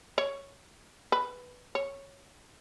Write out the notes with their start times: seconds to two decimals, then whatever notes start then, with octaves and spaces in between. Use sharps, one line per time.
0.18 C#5
1.12 B4
1.75 C#5